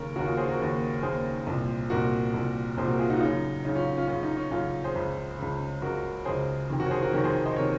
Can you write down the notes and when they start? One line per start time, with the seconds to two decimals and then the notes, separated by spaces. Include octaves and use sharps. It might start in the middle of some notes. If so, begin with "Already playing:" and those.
Already playing: D#2 C#3 A#4 C#5
0.15 D#2 C#3 F#4 A#4
0.27 F4 G#4
0.37 G#4 C5
0.49 F#4 A#4
0.59 D#2 C#3
1.03 D#2 C#3 G#4 C5
1.47 C2 A#2
1.90 C2 A#2 F#4 A#4
2.34 C2 A#2
2.77 C2 A#2 G#4 C5
2.88 F#4 A#4
2.99 F4 G#4
3.10 D#4 F#4
3.17 F4
3.21 F#2 C#3 D#4
3.65 F#2 C#3 D#4
3.75 C#4 F4
3.97 C#4 F4
4.08 F#2 C#3 C#4
4.23 D#4
4.37 C#4
4.51 F#2 C#3 C#4 F4
4.84 G#4 C5
4.95 C#2 C#3
5.39 C#2 C#3
5.82 C#2 C#3 F#4 A#4
6.25 C#2 C#3 G#4 C5
6.70 F2 C3 D#3
6.80 F#4 A#4
6.86 C#5
6.91 G#4 C5
7.02 F#4 A#4
7.13 F2 C3 D#3 A#4 C#5
7.24 G#4 C5
7.46 C5 D#5
7.56 C3 D#3 A#4 C#5